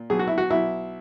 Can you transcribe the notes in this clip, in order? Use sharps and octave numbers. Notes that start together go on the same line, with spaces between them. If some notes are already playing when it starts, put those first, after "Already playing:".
Already playing: A#2
B1 G#4
F#4
E4
F#4
B1 E4